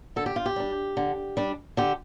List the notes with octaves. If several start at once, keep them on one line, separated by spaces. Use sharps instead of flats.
D3 A4
G4
F4
G4
G3 D4
D3
G3 D4
D3 G4